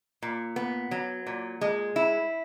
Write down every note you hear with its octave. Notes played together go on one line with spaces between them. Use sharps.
A#2
B3
F#3
A#2
G#3
E4